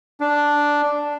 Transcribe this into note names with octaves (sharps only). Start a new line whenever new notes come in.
D4